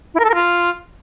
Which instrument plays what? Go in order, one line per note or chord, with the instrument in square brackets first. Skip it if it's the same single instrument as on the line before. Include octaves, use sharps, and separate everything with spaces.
[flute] E4
A#4
A4
A#4
F4